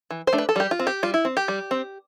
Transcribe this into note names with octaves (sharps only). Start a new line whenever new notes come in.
E3
C5
A3 D4
B4
A4
G3 G4
F4
C4
G4
G3 F4
E4
C4
G4
G3
C4